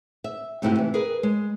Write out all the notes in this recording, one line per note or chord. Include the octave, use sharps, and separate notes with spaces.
E5
G#2 C3 A3 E4 F#4 G4
E3
G#4 A#4 B4
G#3